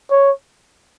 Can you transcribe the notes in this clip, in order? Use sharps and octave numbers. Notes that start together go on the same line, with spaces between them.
C#5